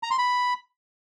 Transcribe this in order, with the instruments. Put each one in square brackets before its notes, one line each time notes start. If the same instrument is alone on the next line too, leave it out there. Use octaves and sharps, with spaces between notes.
[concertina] A#5
C6
B5